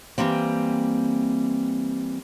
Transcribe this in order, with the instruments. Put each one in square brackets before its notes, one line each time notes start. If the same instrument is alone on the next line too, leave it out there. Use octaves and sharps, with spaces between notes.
[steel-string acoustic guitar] E3 F3 G3 A#3 C4